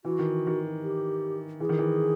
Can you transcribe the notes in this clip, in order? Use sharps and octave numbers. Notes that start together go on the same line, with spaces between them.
E3 F#4
D#3
D#3
G4
E3 G#4
D#3
E3